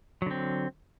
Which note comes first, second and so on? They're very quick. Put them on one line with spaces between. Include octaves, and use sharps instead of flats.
F#3 D3 C4